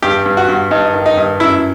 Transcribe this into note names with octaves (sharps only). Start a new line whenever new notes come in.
G2 G4
G2
F#4
G2
G2 D#4
D#3
D#4
G2
F#2 E4